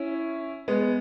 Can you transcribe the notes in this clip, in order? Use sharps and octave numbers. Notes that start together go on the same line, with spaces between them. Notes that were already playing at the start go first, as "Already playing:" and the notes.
Already playing: C#4 E4
G#3 B3